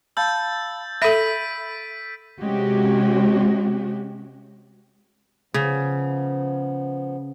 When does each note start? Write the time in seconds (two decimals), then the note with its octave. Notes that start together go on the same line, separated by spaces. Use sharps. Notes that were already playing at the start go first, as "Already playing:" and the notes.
0.17 F5 A5 B5 E6 G6 A6
1.02 A4 E5 B5 B6 D7 D#7 F#7
2.39 C3 G#3 C#4 F#4 G4
5.54 C#3 F3 B3